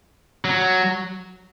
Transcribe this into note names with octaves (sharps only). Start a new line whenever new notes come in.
F#3